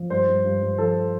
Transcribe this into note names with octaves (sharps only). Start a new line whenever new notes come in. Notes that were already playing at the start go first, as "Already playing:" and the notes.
Already playing: F3
G2 C5
G2
G2
G2
F3 A4